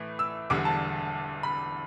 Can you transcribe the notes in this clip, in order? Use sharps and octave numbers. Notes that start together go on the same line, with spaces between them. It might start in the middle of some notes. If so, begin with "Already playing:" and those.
Already playing: A2 E3 A3
E6
E1 E2 D3 G3 D6
A5
B5